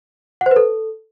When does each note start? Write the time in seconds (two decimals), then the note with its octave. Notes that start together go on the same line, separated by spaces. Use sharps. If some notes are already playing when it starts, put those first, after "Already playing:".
0.41 F#5
0.46 C5
0.51 B4
0.56 A4